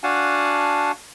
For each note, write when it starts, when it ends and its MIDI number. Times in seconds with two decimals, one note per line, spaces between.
0.03 0.92 62
0.03 0.92 66
0.03 0.92 77
0.03 0.92 78
0.03 0.92 80
0.03 0.92 81